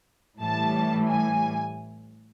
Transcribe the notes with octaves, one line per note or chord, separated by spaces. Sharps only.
A2 E3 G3 A5
G#5